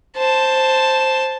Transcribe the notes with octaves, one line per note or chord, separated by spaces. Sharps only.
C5 A5